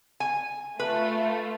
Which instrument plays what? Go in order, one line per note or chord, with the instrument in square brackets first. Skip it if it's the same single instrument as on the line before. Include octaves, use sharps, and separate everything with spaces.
[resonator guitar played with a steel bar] G#5
[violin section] A3 F4 [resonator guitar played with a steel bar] B4